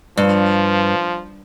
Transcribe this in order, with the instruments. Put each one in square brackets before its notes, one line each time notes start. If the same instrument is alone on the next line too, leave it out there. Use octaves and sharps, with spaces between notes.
[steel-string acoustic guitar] G2 [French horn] F3